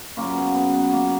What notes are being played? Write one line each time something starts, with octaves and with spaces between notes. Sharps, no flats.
F#2 C#3 F#3 A#3
B3
B3
B3
A#3